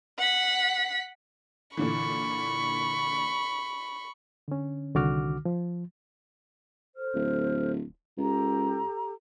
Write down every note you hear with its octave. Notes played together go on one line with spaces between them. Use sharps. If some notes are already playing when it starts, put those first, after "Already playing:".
F#5 B6
A#2 D3 E3 B5 C#6
D3 C#4
C2 D3 D#3 F#4 D6 F6
F3
A4 C5 F6
D1
C#2 G4 A4 A#5